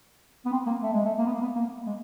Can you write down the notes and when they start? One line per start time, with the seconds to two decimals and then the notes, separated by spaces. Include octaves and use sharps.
0.45 B3
0.52 C4
0.66 A#3
0.82 A3
0.93 G#3
1.05 A3
1.18 A#3
1.26 B3
1.33 A#3
1.42 B3
1.55 A#3
1.86 G#3